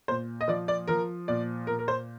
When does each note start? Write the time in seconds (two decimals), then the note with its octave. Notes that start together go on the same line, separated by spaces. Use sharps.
0.08 A#2 C5
0.41 D#5
0.48 F3 D5
0.68 D5
0.88 F3 A#4
1.28 A#2 D5
1.67 A#2 A#4
1.79 A#4
1.88 C5